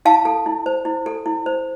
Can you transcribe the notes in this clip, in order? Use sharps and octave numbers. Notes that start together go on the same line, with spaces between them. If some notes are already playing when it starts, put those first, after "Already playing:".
E4 F5 A5
A4
E4
C5
E4
A4
E4
C5